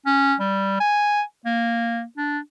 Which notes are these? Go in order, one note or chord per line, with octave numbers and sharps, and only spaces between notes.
C#4
G3
G#5
A#3
D4